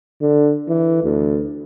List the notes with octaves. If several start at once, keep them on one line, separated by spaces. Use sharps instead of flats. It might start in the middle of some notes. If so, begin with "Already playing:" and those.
D3
E3
D2